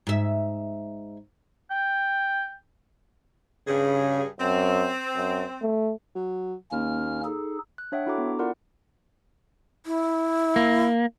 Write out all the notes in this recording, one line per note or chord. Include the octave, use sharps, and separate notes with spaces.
G#2 E5
G5
G2 C#3 G#4
F#2 C4
F#2
A3
F#3
D#2 A#3 C#4 F6
D#4 G#4 A4
F#6
D4 C#5 E5 F#5 G5
D4 E4 F#4 A4 A#5 D6
B3
E4 F4 A#4 D5 F#5
E4
A#3